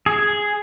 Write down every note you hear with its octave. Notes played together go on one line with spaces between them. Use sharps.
G#4